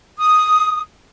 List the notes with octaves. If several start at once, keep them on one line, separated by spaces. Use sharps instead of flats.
D#6